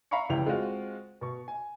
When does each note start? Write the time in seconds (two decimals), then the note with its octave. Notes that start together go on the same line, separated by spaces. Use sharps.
0.11 E5 F5 A#5 B5 C#6 C#7
0.29 F1 C#2 E3 E4 G4 F7
0.46 G#3 C4 F4 F#4
1.21 B2 C#6
1.48 G#5